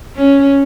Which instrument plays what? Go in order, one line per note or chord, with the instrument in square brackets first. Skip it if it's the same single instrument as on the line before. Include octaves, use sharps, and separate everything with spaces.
[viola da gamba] C#4